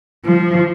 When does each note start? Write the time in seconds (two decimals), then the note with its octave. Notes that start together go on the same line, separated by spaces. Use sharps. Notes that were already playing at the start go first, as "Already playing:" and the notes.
0.25 F3